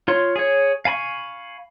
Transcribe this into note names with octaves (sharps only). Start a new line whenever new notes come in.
F4 C#5 C6
G#4 C#5
F5 G#5 B5 C#6